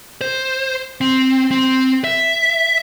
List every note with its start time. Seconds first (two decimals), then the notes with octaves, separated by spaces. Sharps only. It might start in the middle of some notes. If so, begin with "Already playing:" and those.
0.21 C5
1.01 C4
1.51 C4
2.04 E5